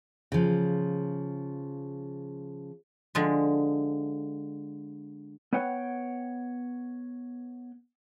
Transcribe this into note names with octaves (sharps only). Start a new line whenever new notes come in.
C#3 F3
D3 F3 G#3
B3 B4 C#5 F#5 G5